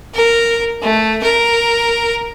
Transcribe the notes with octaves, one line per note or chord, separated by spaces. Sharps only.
A#4
A3
A#4